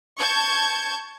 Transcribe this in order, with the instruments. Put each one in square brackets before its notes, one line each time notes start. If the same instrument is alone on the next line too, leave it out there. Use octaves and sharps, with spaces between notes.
[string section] A5 C#6 G6 G#6